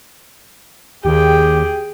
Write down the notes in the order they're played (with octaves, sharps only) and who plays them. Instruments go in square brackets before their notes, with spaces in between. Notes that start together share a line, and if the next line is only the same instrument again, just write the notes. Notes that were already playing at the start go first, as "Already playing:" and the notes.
[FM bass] D#2 [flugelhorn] G4 [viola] G#4 G5